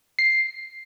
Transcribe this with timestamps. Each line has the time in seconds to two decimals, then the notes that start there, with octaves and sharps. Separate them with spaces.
0.19 C7